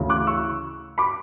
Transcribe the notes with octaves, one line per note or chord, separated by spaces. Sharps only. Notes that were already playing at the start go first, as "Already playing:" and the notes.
Already playing: D2 C#3 E3
D6 F#6
C#6 E6
B5 D6